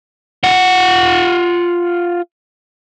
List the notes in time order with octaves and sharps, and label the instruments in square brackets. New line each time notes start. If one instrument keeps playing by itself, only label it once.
[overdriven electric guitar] F4 F#5